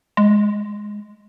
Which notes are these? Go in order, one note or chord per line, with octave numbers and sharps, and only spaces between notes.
G#3